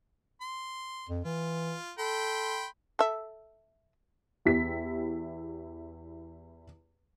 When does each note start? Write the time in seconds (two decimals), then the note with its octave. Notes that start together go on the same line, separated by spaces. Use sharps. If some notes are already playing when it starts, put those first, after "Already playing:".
0.41 C6
1.09 F2
1.25 E3 F4
1.98 A4 G5 B5 C6
2.99 A4 E5
4.45 E2 E4 G4 B6